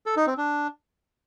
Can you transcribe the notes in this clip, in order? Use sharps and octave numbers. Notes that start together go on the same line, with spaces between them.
A4
D#4
C4
D4